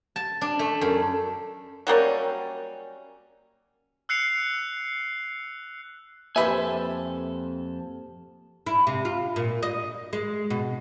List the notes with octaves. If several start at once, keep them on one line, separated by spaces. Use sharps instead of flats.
A5
D4
A3
F#2
F#3 G3 A#3 C#4
E6 F#6 C7 C#7 F7
F2 A#3 G4 A4 B4 C5 E5 G#5
E4
C3
F4
A#2
D#5
G#3
B2